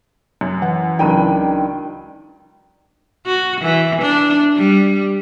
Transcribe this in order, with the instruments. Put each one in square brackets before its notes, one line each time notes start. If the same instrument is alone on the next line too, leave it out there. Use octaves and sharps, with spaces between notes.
[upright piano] F#2
[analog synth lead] E3 [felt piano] F#5
[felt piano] C#2 F#3 [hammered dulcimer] D#3 D4 B5 [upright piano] G5 A#5 D#7
[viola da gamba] F#4
E3
D4
G3